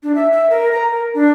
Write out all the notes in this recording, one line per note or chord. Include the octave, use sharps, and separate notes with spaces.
D4
E5
E5
A#4
A#5
A#4
D4